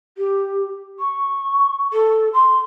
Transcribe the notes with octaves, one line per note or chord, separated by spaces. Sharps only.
G4
C#6
A4
C6